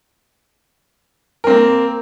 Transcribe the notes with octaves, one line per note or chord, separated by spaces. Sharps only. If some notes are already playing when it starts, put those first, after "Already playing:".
A#3 C4 A#4